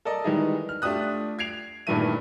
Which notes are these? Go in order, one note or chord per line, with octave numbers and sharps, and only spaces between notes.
A4 A#4 D5 D#5
D#3 E3 G3 G#3 D#4 G#4
F6
A3 D4 F4 G4 D#6 F#6
G#6 C7 D7 F7
G2 A#2 D#3 E3 A3 D#7